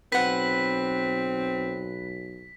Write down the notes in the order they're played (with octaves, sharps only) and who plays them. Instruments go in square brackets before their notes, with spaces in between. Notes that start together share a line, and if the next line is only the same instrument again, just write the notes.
[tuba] B1 [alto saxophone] C4 [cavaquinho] B4 F#5 [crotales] B6